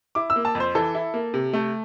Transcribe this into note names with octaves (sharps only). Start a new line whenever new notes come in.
E4 D6
E6
A#3
A5
F2
C5
E3 A4
E4
A#3
C3
A3